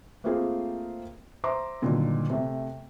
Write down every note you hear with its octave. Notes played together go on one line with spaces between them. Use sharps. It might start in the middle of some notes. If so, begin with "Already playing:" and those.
A3 A#3 C4 F4 G#4 A#4
C5 E5 A#5 C6 D6
G2 A#2 D3 D#3 F#3
C3 A3